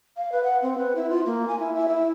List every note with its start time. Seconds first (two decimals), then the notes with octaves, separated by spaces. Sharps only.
0.17 F5
0.32 B4
0.44 F#5
0.62 C4
0.78 B4
0.96 E4
1.10 F4
1.26 A#3
1.48 G#5
1.60 E4
1.75 E5
1.89 E4